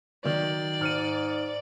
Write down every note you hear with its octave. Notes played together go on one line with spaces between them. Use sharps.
D#3 F#3 D5
G#2 F6 C#7 D#7